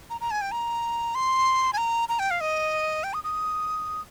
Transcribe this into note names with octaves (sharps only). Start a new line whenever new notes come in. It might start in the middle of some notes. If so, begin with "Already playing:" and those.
A#5
A#5
G#5
G5
A#5
C6
G#5
A#5
A#5
G5
F5
D#5
G5
D#6
D#6